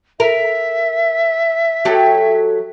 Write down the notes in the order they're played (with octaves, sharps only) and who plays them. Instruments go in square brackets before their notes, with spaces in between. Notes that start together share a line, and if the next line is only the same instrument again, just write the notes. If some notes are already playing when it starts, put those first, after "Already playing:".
[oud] A#4 [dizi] E5
[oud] F#3 G4 A4